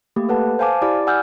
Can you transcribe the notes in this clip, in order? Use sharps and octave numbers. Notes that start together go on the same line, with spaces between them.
A3 A#3 G4
A4 B4 F#5 A5
C5 F5 G#5 A5 D6
E4 G4 D5 D6
F#5 G#5 E6 F6 G6